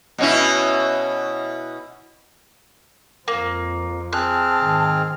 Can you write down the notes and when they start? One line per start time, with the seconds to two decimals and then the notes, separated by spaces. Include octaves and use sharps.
0.18 B2 C#4 E4
3.28 F2 F3 A#3
4.13 C4 G#4 A5 F6 F#6
4.60 G#2 D#3